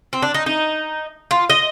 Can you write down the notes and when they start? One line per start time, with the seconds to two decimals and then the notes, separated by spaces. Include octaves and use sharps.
0.13 C4
0.22 D4
0.34 D#4
0.46 D#4
1.31 F4
1.50 D#5